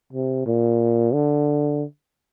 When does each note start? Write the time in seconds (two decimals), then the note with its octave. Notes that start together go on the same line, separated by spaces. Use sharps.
0.13 C3
0.46 A#2
1.13 D3